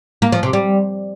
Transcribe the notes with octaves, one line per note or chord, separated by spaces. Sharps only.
A#3
F3
C3
G3